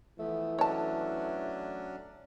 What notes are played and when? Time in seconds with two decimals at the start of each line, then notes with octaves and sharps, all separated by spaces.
0.20 E3 F3 A3 B3
0.59 F#3 C#4 D4 C#5 A5